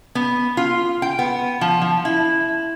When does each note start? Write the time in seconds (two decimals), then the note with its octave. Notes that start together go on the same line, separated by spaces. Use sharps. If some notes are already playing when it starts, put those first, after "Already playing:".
0.15 B3
0.57 F4
1.02 G5
1.19 B3
1.61 F3
1.82 F3
2.05 E4